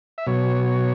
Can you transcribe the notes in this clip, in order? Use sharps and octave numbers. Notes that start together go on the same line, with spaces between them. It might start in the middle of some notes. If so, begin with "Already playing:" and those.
E5
B2 F#3 C#5